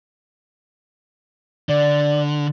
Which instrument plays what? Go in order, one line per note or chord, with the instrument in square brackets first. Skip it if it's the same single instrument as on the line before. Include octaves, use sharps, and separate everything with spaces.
[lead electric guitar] D3 [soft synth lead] D5